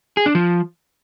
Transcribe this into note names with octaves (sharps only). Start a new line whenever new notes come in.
G#4
D4
F3